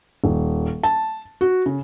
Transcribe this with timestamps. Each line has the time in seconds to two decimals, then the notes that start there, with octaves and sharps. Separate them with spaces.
0.24 D#1
0.83 A5
1.41 F#4
1.66 C#3